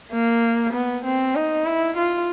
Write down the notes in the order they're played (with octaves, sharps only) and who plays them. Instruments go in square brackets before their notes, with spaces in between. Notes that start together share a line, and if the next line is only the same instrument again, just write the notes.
[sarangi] A#3
B3
C4
D#4
E4
F4